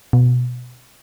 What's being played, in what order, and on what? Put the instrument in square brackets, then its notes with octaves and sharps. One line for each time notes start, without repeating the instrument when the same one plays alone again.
[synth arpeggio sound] B2